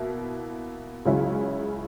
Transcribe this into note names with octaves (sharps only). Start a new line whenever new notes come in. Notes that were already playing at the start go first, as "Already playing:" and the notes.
Already playing: B2 A#3 E4
C#2 C#3 F#3 C#4 E4